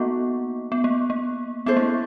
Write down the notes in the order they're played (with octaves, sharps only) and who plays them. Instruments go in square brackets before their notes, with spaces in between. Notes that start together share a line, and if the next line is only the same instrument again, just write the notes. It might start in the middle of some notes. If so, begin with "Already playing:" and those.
Already playing: [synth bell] A#3 B3 [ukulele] D#4 F#4 A4
[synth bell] B3
A#3
A#3
[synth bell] B3 [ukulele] C#4 E4 A4 C5
[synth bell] A#3